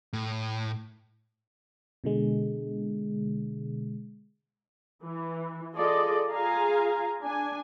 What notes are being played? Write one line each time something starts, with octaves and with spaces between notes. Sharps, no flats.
A2
B2 D3 G#3
E3
F4 G#4 A4 D5 D#5
F4 G#4 F5 G#5 A#5
D4 G#5